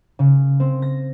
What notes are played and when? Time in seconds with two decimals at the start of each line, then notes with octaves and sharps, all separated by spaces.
0.19 C#3
0.60 C4
0.82 A#6